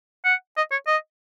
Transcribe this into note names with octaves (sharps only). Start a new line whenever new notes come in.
F#5
D#5
C#5
D#5